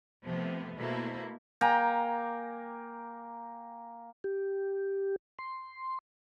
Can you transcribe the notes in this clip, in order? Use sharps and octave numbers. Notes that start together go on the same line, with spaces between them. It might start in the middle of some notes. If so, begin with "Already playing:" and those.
C3 F3 A3 B3
B2 A3 A#3 E4 C5
A#3 G5 G#5 A#5
G4
C6